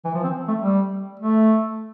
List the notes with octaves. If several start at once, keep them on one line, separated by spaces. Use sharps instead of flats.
E3
F3
C4
A3
G3
A3